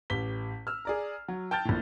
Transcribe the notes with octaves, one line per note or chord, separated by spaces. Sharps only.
A1 G4 B6 G7
E6 F6
G#4 D5 A#5
F#3
G5 A5 F6 G6 A6
A#1 A2